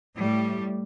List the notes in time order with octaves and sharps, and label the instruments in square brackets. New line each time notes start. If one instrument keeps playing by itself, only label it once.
[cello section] A2 G3